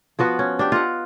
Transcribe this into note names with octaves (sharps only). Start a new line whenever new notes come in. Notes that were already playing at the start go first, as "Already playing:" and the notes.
F3 B3 F#4 B4
C#4
D4 G4
F4 D#5 F#5